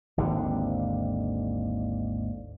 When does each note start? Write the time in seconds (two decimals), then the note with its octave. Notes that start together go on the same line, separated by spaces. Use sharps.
0.17 G#1 D#2 D3